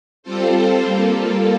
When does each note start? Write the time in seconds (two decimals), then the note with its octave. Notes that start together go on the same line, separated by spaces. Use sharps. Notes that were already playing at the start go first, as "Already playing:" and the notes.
0.23 G3 C4 F4 A4 C5
0.83 G3 A#3 F4 A4